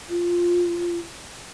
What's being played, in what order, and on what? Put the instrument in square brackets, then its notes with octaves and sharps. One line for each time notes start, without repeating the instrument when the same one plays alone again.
[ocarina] F4